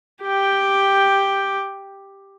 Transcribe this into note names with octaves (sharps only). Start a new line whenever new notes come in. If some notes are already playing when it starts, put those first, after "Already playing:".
G4 G5